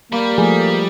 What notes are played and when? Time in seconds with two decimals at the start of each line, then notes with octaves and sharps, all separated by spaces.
0.12 G3 A#3 B5
0.38 F3 A3 G#4